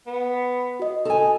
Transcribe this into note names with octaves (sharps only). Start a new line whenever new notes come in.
B3
F#4 D#5
D#4 A4 G#5